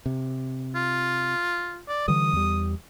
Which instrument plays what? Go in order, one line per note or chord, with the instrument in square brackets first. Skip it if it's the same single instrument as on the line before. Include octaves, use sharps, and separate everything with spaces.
[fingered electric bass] C3
[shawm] F4
D5
[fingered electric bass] D3 E3 G3 [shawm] D#6
[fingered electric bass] E2 G3